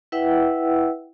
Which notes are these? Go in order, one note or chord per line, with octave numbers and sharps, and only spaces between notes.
E4 B4 E5 F#5 G5 E6